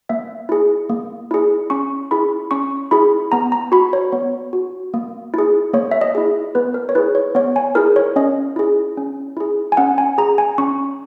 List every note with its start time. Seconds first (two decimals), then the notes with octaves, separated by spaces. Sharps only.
0.09 A#3 E5
0.49 E4 G#4
0.90 A#3
1.31 E4 G#4
1.70 C#4 C#6
2.11 E4 G#4 B5
2.51 C#4 C#6
2.91 E4 G#4 B5
3.32 B3 A#5
3.52 A#5
3.72 F#4 B5
3.93 C#5
4.12 B3 C#5
4.53 F#4
4.94 A#3
5.34 E4 G#4
5.73 A#3 C#5
5.92 E5
6.01 D#5
6.15 E4 G#4
6.55 B3 B4
6.74 A#4
6.89 C#5
6.95 E4 G#4 B4
7.15 C#5
7.35 B3 C#5
7.56 G#5
7.75 E4 G#4 A#4
7.96 C#5
8.16 C#4 D#5
8.56 E4 G#4
8.97 C#4
9.37 E4 G#4
9.72 G#5
9.77 C#4 F#5
9.98 G#5
10.18 G#4 A#5
10.38 G#5
10.58 C#4 C#6